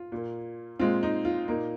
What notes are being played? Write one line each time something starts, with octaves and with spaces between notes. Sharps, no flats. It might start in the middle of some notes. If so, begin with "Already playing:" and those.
Already playing: F4
A#2 A#3
A#2 G#3 C4 F4
D#4
F4
A#2 A#3 D#4